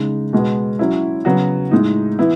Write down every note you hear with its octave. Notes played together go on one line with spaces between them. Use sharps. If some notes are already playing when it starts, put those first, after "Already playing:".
Already playing: C#3 G#3 D#4
B2 G#3 B3
F#3 C#4 E4
C#3 F#3 B3 F#4
A2 G#3 D#4
E3 B3 E4